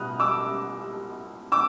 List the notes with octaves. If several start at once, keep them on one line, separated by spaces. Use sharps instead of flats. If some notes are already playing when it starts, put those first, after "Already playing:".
Already playing: B2 G3 D#6 F6 F#6
D6 E6
D6 E6